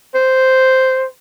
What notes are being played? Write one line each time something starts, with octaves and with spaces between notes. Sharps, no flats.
C5